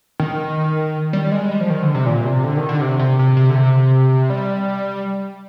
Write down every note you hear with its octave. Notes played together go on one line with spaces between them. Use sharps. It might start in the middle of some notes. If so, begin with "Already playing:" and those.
D#3
G3
G#3
G3
F3
D#3
D3
C3
A#2
C3
D3
D#3
D3
C3
C3
C3
C3
D3
C3
G3